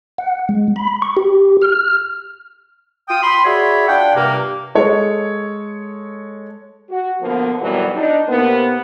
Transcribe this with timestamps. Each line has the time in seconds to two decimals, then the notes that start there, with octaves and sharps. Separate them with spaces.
0.18 F#5
0.49 G#3
0.76 B5
1.02 C#6
1.17 G4
1.62 F6
3.09 F4 G5 D#6
3.22 B5 C6
3.44 F#4 G#4 C#5 D5 E5 B5
3.88 D4 F4 F#5 G5
4.15 G2 C3 A#3
4.75 G#3 A4 C#5
6.90 F#4
7.21 B2 D3 F3 A#3 B3
7.61 F2 B2 D#3 E3 F#3 G3
7.96 D4 D#4
8.28 C3 A#3 B3